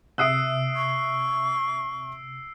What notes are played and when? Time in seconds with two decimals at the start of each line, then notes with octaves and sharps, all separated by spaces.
0.18 C3 E5 D#6 E6 F#6 C7 D7
0.76 C#6